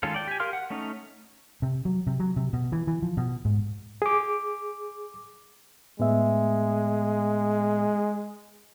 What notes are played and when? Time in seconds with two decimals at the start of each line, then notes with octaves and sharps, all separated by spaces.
0.03 D#3 G#3 C#4 F4 A4
0.14 D5 G5
0.28 G4 G#5
0.40 G4 A#4 F5 C6 F6
0.53 F#5
0.70 A3 C#4 D#4
1.62 C3
1.85 F#3
2.07 C3
2.20 F#3
2.36 C3
2.53 B2
2.72 E3
2.87 E3
3.02 F3
3.17 B2
3.45 G#2
4.02 G#4 D6
6.00 A2 G#3 B3 E5